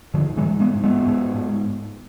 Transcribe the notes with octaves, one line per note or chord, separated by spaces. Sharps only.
G#2 D3 F3
E3 G#3
G#2
G#3 B3
G#2
G#3 B3
G#2
G#2